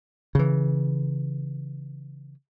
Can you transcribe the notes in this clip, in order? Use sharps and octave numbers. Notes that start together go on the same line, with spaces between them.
C#3 E3